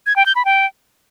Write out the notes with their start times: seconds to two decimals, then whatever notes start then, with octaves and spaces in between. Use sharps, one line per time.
0.06 G#6
0.16 G5
0.26 G6
0.36 B5
0.45 G5